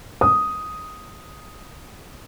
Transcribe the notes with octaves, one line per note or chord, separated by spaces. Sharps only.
D#6